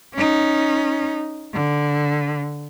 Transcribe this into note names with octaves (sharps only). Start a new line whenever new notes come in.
C#4 D#4
D3